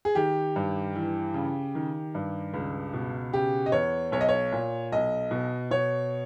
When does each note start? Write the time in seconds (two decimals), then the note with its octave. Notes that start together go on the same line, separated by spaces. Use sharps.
0.05 G#4
0.15 D#3 G4
0.56 G2
0.95 E3
1.34 C#3
1.75 D#3
2.15 G2
2.54 C#2
2.93 B2
3.33 C#3 G4
3.66 D#5
3.72 E2 C#5
4.12 B1 C#5
4.21 D#5
4.29 C#5
4.52 A#2
4.92 B1 D#5
5.31 B2
5.71 B2 C#5